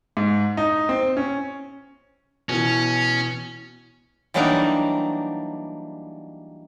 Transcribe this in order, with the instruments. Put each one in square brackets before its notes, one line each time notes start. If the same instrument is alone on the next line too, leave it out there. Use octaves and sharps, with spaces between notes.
[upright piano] G#2
D#4
C4
C#4
[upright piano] B2 E3 [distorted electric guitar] C#4
[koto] E3 F#3 G3 A#3 D4 D#4